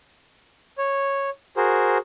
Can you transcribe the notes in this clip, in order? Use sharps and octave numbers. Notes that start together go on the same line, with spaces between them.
C#5
F#4 G#4 A#4 C5